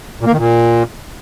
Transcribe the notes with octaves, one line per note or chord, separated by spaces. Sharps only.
A#2
A#3
D#3
A#2